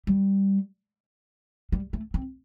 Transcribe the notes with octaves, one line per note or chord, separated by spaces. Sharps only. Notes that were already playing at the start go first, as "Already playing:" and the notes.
G3
G3
A3
C4